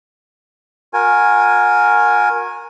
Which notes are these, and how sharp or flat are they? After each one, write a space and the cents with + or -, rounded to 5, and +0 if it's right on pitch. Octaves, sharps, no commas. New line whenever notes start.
F#4 -35 A#4 +0 G#5 +0